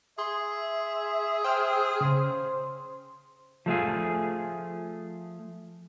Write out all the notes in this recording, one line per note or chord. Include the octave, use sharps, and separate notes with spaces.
G#4 E5 C6
C5 G5 E6 F6
C#3 C5
F3 A3 F4 G#4